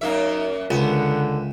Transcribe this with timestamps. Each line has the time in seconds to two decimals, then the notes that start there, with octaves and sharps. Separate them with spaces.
0.01 F#2 A#3 D#4 E5
0.71 C#2 D3 B3